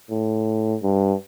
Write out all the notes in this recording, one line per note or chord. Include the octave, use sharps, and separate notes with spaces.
A2
G2